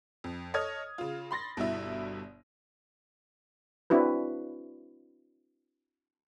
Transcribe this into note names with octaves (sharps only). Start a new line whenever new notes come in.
F2
A4 C#5 D#5 D#6 F6 G#6
C#3 F4
B5 C6 A6 A#6
G1 G2 B2 E4 E5
C4 D4 E4 F#4 B4